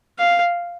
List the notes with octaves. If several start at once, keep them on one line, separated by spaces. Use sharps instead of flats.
F5